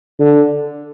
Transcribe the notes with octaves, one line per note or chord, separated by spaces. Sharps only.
D3